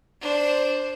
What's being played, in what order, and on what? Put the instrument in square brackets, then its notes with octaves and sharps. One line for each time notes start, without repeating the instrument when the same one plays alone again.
[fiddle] D4 C5